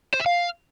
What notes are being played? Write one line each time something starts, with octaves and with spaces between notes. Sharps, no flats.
C5
E5
F5